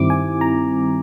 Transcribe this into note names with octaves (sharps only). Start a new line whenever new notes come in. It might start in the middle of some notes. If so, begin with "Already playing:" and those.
Already playing: G2 D#3 G3 C4 E4 D6
G#5
A#5